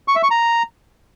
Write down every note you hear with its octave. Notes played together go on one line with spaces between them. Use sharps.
C#6
E5
C#6
A#5